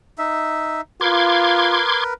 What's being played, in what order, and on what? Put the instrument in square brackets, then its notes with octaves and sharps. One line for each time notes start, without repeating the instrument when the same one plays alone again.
[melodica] D#4 E5
[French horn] F4 [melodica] A#4 B4 [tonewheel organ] C6 D6 G#6